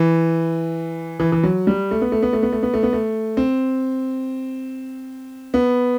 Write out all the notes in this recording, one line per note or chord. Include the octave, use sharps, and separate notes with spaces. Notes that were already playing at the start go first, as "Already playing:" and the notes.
Already playing: E3
E3
E3
F#3
G3
A3
B3
A3
B3
A3
B3
A3
B3
A3
B3
A3
C4
B3